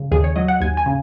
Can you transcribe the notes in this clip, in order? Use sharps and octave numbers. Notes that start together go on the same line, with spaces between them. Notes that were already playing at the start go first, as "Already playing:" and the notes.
Already playing: C#3
D#2 G#4
C#5
F#3 D#5
F#5
D#2 G#5
G#5
C#3